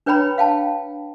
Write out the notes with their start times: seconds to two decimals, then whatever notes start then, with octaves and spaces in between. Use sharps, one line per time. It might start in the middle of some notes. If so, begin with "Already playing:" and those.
0.06 D4 B4 C#5 G5 A#5 B5
0.38 F5 G5 A5